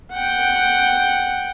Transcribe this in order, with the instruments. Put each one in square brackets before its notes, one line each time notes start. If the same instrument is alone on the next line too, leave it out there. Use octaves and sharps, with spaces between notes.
[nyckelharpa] F#5 G5